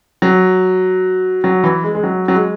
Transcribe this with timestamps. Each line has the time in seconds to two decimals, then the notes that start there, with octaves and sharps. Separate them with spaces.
0.22 F#3
1.44 F#3
1.64 E3
1.84 G#3
1.95 G#3
2.03 F#3
2.28 F#3
2.35 G#3